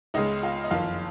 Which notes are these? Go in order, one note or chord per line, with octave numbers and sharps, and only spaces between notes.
C#2 C#3 G#3 D#4 D#5
F4 F5
D#5
F#1 F2 D#3 F4 F5